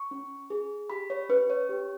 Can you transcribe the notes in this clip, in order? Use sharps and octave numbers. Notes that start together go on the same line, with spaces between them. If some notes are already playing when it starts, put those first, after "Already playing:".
Already playing: C#6
C#4
G#4
G4 B5
C#5
C#4 B4
C#5
G4